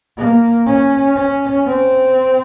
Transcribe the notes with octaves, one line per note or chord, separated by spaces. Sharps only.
A#3
C#4
C#4
C4